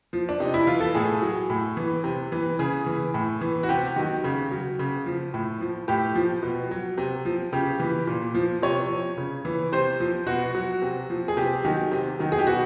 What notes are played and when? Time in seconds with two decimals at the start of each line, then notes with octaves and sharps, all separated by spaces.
0.13 F3
0.29 D4
0.40 C3 D#4
0.54 E4
0.67 E3 F4
0.81 A4
0.94 A2 G#4
1.22 F#3
1.50 A2
1.77 E3
2.04 C3
2.32 E3
2.59 C#3 G#4
2.86 E3
3.14 A2
3.41 E3
3.63 F#4
3.69 C3 G4
3.96 D#3 F#3
4.24 C#3
4.51 F#3
4.79 C#3
5.06 F3
5.34 A2
5.61 F3
5.88 A2 G4
6.15 F3
6.43 B2
6.71 F#3
6.98 C3
7.25 F3
7.53 C#3 G4
7.80 E3
8.07 A#2
8.35 F3
8.62 C3 C#5
8.90 F3
9.17 C#3
9.45 E3
9.72 C3 C5
10.00 F3
10.27 B2 F#4
10.55 F#3
10.82 C3
11.10 F3
11.28 G#4
11.37 C3 G4
11.65 D#3 F#3
11.91 C3
12.19 D#3 F#3
12.32 G#4
12.39 G4
12.47 B2 F#4